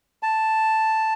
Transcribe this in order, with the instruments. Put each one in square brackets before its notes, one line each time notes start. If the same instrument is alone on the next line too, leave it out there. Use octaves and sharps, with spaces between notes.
[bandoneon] A5